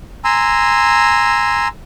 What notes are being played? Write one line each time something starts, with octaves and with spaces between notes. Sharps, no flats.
G#5 A#5 C6 E6